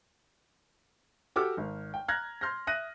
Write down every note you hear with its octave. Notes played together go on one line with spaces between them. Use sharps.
F#4 G4 A4 D6 E6 F6
G#1
G5
A#5 F6 F#6 G#6 A#6
C6 F6 G6 A#6
E5 D#6 F#6 A#6 D#7